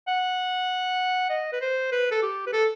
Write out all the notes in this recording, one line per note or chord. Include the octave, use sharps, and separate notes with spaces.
F#5
D#5
B4
C5
B4
A4
G4
B4
A4